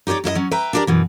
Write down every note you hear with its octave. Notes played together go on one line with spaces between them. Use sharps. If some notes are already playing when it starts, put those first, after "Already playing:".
D#4 G4 B4 C#5 D5
F#2 E4 G4 D#5
F#3 C#4
B4 E5 G5 A#5
D4 E4 G4 A#4 D5
F#2 B2 E3